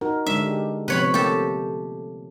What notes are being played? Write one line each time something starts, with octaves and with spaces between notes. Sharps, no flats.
D#4 F#4 A#4
D3 G#3 D4 E5
G4
C3 F3 B3 B4 C#5 B5
A3 A#3 G4 A4